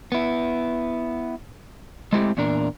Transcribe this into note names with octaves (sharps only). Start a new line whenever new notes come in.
B3 E4
G#3 A3 C4 E4 G4
E2 A#2 D4 A#4